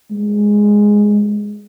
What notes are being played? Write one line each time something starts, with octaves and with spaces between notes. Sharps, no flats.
G#3